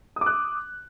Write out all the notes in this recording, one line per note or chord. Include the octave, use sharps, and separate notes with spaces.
D6 D#6 F#6